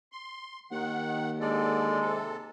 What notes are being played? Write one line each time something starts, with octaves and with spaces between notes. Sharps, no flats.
C6
D#2 D#3 F#5
D3 G#3 A4 D5
C3 A4